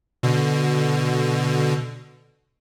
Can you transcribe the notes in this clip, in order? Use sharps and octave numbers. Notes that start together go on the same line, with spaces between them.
B2 D3